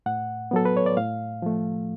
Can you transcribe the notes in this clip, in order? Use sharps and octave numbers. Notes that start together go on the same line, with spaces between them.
A2 F#5
F#3 B3 A4
B4
C#5
D5
A2 F5
F3 A3